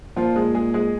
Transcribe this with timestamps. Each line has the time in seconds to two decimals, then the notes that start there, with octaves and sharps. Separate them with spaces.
0.16 A#2 F3 F4
0.36 G#3 G#4
0.55 G#3 G#4
0.74 G#3 G#4